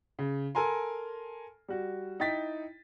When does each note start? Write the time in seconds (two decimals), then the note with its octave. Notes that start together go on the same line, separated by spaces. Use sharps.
0.19 C#3
0.55 A4 A#4 G#5 A#5 C6
1.68 G3 F#4
2.20 D#4 E4 G5 A6 B6